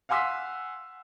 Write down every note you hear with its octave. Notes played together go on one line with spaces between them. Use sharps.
F5 F#5 G#5 C6 E6 B6